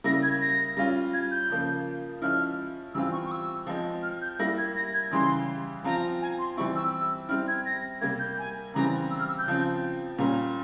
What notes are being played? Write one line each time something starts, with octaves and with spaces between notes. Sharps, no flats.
C#3 G3 A#3 E4 A#6
G#6
A#6
G3 C#4 F4
G#6
G6
C#3 F3 A#3
F3 G#3 C#4 E4 F6
E3 G3 C4 F4 E6
C#6
C#6
E6
F3 G#3 C4
F6
G6
G3 A#3 E4 A#6
G#6
A#6
G#6
C#3 E3 G3 C6
F3 C4 F4 A#5
G#5
C6
E3 G3 C4 E4 C#6
E6
E6
G3 C4 E4 F6
G#6
A#6
C3 G3 A#3 G#6
G6
G#5
C#3 E3 G3 C4 A#5
E6
F6
E6
G6
C#3 F3 C4
A#2 G3 C#4 A#5